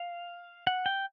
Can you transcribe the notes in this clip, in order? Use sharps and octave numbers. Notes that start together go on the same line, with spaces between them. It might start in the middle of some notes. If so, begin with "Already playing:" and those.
Already playing: F5
F#5
G5